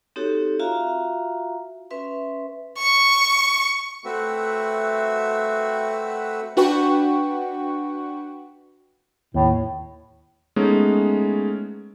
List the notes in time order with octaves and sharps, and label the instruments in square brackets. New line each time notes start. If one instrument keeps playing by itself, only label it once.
[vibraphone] C4 D#4 F#4 G4 A4 C#5
F4 F#4 E5 F5 A#5
C#4 B4 E5 C6
[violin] C#6
[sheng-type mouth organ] A3 C4 F#4 B4 E5
[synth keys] D4 F#4 B4 F#5 G5 C#6
[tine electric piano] D#2 [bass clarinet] A2
[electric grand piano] G#3 A3 B3 C#4 D#4